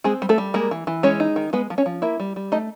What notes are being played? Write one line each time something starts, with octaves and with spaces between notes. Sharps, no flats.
G#3 C4 G#4
G3
A3 A4
G3
G#3 A#3 A#4
E3
E3
G#3 C#4 C#5
D#4
D#3
G#3 B3 B4
F3
C#4 C#5
F3
A#3 E4 E5
G3
G3
A3 D#4 D#5